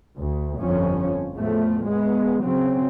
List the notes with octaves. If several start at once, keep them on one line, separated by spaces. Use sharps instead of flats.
D2
G1 F2 F3 C#4
E2 A2 F3 A3
G#3 B3
C#3 F#3 C4